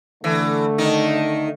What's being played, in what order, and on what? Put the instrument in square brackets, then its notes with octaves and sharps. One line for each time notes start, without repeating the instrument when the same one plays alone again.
[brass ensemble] D3 A3 [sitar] E3
[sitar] D#3 D#4